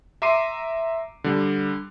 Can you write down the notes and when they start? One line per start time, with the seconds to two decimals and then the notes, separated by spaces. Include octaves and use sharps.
0.22 E5 A#5 C6 D6 C7 D#7
1.24 D3 G3